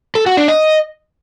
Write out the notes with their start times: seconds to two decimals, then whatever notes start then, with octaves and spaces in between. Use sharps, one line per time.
0.15 A4
0.26 F#4
0.37 D4
0.48 D#5